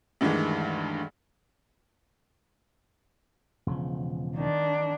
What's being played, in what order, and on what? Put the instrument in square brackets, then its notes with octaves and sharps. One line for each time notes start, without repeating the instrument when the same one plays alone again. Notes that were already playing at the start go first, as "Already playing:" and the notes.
[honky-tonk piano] D2 G2 D#3 E3 G#3
[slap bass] E1 C#3 F3
[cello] D#3 D4